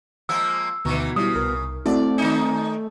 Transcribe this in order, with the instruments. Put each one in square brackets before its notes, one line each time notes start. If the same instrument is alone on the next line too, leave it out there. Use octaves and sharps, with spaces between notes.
[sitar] F3 G#3 A#3 [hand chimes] E6
[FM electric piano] D2 A#5 C#6 [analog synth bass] B2 [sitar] D#3 E3
[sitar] C#3 [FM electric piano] G3 E4 [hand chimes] D#6
[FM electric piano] C2 A#4
[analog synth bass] A3 [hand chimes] C4 [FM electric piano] E4 F#4 A4 [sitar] D5
[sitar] D#3 D#4 [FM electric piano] G#5 D#6 G6